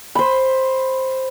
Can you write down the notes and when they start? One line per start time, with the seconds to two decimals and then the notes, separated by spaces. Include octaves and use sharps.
0.15 C5 B5